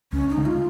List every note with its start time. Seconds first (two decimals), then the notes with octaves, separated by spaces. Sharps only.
0.13 C#2 C#4
0.30 D#4
0.37 C#3 G#3
0.46 F4